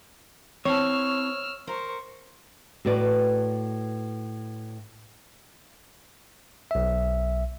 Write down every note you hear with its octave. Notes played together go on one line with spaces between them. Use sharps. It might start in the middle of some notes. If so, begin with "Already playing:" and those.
C4 E4 C#5 A5 E6 F6
A#4 C5 A#5 C#6
A2 F#4 B4 D5
B1 E5